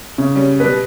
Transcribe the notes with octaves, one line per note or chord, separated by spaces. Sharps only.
C#3
G3 C#4
B2 G3 B4